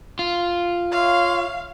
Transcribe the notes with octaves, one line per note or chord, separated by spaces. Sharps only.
F4
C#5 E5 F5 C6